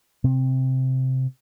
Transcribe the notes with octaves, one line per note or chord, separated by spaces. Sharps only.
C3 C4